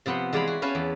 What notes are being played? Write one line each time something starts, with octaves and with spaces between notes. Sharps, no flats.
C3 F3 B3 F#5 C6
E3 G#3 D5 F5 A#5 B5
F#4
C#4 B4 F5 G#5 A5
E2